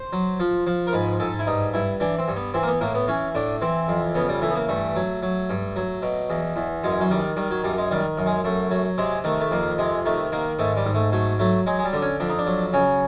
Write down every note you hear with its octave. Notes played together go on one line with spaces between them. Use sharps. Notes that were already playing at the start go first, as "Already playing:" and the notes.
Already playing: C5
F#3
F3
F3
A#4
G#2 B4
G#2 A4
E4
G2 D#4
G2 E4
E3 D4
C4
G2
B3
E3 C4
A#3
B3
A2 A#3
B3
E3 C#4
A2 D4
E3 C4
F2
C#3 B3
G3
E3 A3
B3
A#3
G2 A3
F#3
F#3
G2
F#3
B2
E2
E2
F#2 G#3
F#3
D#3 G3
D#3 G3
F#3
F#2 G3
G#3
D#3 G3
F#2
G#3
F#2 A3
F#3
C3 G#3
D#3 A3
A3
F2 A#3
C3 G#3
D#3 A3
D#3 A#3
G#2 A3
G3
G#2
A3
F#3 A3
F#3 A3
F#3 G#3
G#3
G3
D3 D4
C#4
F2 D4
D#4
D4
F#3
C#3 C#4